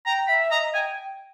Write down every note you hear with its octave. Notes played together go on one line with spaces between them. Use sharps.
G5 A#5
E5 B5
D#5 A#5
G5 G#5